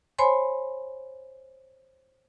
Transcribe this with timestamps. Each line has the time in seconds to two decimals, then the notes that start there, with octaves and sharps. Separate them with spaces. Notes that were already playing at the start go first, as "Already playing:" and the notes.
0.19 C5 C#5 G#5 B5 C6